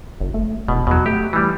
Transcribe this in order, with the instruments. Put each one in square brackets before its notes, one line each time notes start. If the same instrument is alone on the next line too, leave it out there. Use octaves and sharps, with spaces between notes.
[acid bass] F#1
A3
[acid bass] E1 [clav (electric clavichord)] B2
[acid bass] E2 [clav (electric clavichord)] B2 F#3
[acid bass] A3 [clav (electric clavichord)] G4
[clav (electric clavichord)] E3 G3